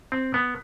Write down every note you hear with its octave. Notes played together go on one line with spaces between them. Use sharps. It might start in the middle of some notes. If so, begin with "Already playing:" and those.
C4
B3